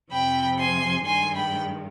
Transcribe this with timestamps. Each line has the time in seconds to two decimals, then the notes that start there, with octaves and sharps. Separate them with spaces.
0.10 F2 C3 F3 G5 B5
0.58 G#5 C6
1.04 G2 D#3 G#3 G#5 C6
1.35 G5 B5